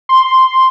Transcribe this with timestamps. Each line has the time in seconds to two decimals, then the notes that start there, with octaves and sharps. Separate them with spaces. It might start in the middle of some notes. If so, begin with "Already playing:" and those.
0.09 C6